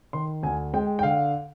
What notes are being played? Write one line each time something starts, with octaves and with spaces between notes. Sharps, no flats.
D#3 C6
D2 G#5
G#3 G5
G5
D3 F5